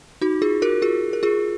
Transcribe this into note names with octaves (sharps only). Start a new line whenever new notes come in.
D#4 F#4
F4 G#4
F#4 A#4
F4 G#4
A#4
F4 G#4